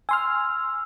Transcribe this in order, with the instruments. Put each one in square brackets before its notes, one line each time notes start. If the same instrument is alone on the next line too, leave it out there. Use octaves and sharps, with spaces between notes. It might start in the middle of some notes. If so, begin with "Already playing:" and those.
[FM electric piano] G#5 C6 F6 [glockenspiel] E6